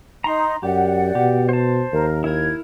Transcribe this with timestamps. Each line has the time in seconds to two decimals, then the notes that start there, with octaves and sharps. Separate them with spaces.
0.24 D#4 A#5 C6
0.63 F#2 G4 D5 F#5
1.15 B2 G4
1.49 C5 A5
1.92 D#2 A#4
2.24 E4 A#4 G#6